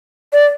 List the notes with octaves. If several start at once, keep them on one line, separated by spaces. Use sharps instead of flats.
D5